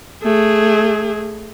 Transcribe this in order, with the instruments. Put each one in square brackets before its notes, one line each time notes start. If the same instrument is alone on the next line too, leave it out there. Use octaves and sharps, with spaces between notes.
[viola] A3 G#4